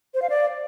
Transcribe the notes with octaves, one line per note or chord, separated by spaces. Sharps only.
C5
F5
D5